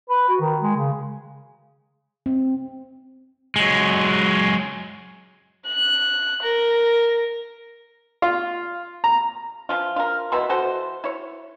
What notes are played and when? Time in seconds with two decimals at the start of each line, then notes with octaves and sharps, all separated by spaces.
0.10 B4
0.29 F#4
0.40 D#3
0.63 G#3
0.77 C#3
2.26 C4
3.56 F#3 G#3
5.67 F#6
6.43 A#4
8.22 F4
9.04 A#5
9.69 E3 F3 F4
9.96 F4 A#4
10.32 B2 E3 E4 C6
10.49 E3 F#4 A4 C5
11.04 E4 C#5